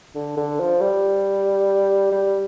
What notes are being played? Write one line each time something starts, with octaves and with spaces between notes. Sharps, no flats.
D3
D3
F3
G3
G3